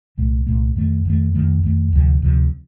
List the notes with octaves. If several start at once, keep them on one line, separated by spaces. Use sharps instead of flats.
C2 A#2 A3
C2 A#2 A3
F2 D#3 A3
F2 D#3 A3
F2 D#3 A3
F2 D#3 A3
D2 C3 F3
D2 C3 F3